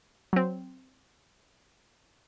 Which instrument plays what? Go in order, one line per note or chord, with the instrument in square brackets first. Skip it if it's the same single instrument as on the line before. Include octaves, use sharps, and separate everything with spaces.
[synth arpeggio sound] F#3 C4